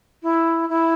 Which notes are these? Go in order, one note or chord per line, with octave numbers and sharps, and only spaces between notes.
E4
E4